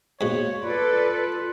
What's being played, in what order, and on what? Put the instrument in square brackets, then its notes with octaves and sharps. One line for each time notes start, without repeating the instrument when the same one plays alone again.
[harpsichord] G#2 B2 [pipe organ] A#3 [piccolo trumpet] C#5
[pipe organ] F4 [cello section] A4 B4 D5 [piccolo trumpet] F#6